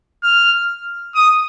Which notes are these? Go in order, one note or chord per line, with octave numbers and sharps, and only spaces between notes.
F6
D#6